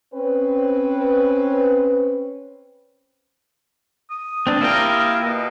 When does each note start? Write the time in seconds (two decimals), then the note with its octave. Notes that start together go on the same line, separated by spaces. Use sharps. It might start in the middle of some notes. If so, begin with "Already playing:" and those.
0.13 C4 C#4 B4
4.11 D#6
4.47 C4 D4
4.61 A#3 E4 F4 G4 A#4 G5
5.21 B2